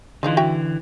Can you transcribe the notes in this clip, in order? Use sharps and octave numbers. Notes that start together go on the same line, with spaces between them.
D3 E3 G#3 D#4 F4
F#4 E5 G5